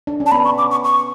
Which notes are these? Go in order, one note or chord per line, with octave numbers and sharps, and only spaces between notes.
D4
C#4
A5
B3 B5
C#6
D6
C#6
C#6